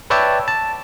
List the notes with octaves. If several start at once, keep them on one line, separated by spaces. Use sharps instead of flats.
B4 C#5 D5 E5 G5 A5
A5